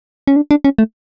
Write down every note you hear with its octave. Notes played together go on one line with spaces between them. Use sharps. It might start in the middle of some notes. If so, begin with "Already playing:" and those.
C#4
D4
D4
C#4
A3